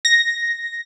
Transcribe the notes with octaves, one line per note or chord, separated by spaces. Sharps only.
A#6